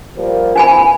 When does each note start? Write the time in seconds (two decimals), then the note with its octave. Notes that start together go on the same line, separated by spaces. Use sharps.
0.17 F3 G3 A#3
0.56 E3 C4 D4 G#5 B5